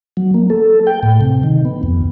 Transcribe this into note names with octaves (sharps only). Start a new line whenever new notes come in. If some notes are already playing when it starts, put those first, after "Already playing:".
F#3
A#3
A4
G5
A2
C3
D#3
B3
F2